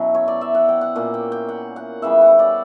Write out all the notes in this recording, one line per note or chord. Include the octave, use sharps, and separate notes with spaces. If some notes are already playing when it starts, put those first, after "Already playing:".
Already playing: B2 F#3 C#4 E4
C#5
D5
E5
F#5
G5
F#5
A#2 A#3 C#4 F#5
G5
G5
F#5
F#5
C#3 E3 G3 B3 E5
F#5
D5